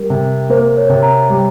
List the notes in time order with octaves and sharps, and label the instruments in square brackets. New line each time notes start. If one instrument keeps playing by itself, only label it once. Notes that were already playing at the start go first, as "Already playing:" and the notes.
Already playing: [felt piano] G3 [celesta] A#4
[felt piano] C3
[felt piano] A#3 [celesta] C5
[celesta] C#5
[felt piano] C3
[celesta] A#5
[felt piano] G3